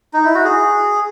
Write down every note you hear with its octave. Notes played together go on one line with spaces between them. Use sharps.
D#4
E4
F#4
G#4